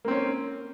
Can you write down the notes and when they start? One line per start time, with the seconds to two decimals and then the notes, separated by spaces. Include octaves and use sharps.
0.05 A#3
0.08 C4
0.11 C#4